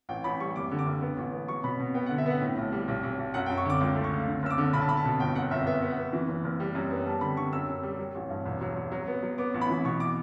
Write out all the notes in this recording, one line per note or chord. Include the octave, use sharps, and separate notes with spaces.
A1 G5
A1 B5
G3 C#6
F#1 D6
D3
D6
F#1
B3
A1
B3
F#3 C#6
B2 B5
B2
B3 G5
D3 F#5
E5
B3 F#5
A2
B1
G3
B1
B1
B1
F#2 F#5
F#2 G5
C#6
D3 D6
C#2 D6
A3
C#6
C#3
D3
F#1 E6
D6
D3
B1 B5
A5
B1 B5
A5
B2
G1 G5
F#2 F#5
G1 E5
B3 E5
B3
F#5
B3
E3
F#1
F#1
G3
F#2
B3
G3 A5
D3 B5
D3 C#6
F#2 E6
F#2
G3
F#3
A1
G2
E1
F#3
F#3
F#3
B3
F#3
B3 D6
A1
B5
E3
B2 C#6
D6